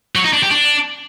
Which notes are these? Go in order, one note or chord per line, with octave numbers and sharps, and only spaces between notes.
F#3
D#4
D4
G4
D4